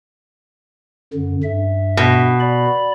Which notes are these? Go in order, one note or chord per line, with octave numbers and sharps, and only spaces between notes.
F#2 D3
G2 E5
B2
D5 B5